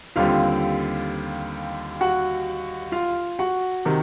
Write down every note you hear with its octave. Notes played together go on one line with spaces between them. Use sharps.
D#2 D3 G3 C4 F4 F5
F#4 F#5
F4 F5
F#4 F#5
C3 D#3